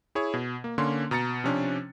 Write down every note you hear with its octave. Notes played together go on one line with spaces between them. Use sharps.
E4 G#4 C#5
B2
A#3
D3 A#3 C#4 C6
B2 A#5 A6 C#7
C3 F3 C#4 D4 C5